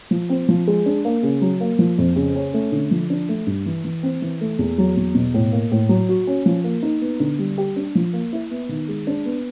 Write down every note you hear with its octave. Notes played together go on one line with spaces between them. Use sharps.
F3
C4
F3
G#3
D4
A#3
C#3
F#3
A#3
F3
F2
C#3
C#4
A3
D3
F3
D4
A3
G2
E3
E3
C4
E3
A3
E2
F#3
E2
B2
A2
A#3
A2
F#3
F#4
C#4
F3
A#3
D#4
B3
D3
G3
G4
D4
F3
A#3
E4
B3
D#3
G#3
D4
B3